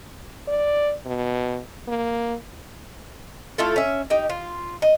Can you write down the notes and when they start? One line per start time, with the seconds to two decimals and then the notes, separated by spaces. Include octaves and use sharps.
0.48 D5
1.06 B2
1.88 A#3
3.58 A3 E4 F4 A4
3.76 C#4 E5
4.10 D#4 G4
4.30 F4
4.82 D#5